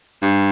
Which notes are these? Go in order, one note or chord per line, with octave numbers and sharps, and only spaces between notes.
G2